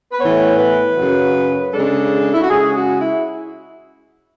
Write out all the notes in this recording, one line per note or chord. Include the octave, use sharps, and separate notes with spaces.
B4
A2 E3 B3 C#5
B4
F#2 C#3 F#3
C#3 G#3 D4 A4
E4
F#4
C#3 G#3 C#4 G#4
F#4
E4